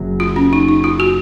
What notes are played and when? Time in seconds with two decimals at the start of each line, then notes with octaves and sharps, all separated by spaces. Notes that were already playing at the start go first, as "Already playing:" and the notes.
Already playing: F#1 F#2 C#3 F#3
0.20 F4
0.36 C#4
0.53 D#4
0.68 D#4
0.84 F4
1.00 F#4